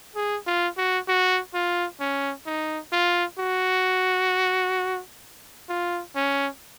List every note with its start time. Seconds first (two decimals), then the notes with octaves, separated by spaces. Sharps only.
0.16 G#4
0.47 F4
0.77 F#4
1.08 F#4
1.54 F4
2.00 C#4
2.46 D#4
2.93 F4
3.39 F#4
5.69 F4
6.16 C#4